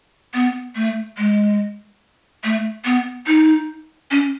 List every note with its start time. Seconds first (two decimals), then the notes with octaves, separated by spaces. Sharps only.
0.34 B3
0.75 A3
1.18 G#3
2.44 A3
2.85 B3
3.27 D#4
4.11 C#4